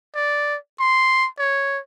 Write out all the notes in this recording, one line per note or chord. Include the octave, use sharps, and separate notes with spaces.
D5
C6
C#5